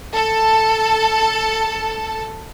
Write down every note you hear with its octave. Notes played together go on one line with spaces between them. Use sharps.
A4 A5